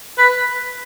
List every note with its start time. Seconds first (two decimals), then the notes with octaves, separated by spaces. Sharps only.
0.18 B4